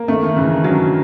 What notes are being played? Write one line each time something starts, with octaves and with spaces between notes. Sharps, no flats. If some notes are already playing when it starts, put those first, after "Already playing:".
Already playing: A#3
D#3 A3
D#3
C#3 E3
D#3
D3 F#3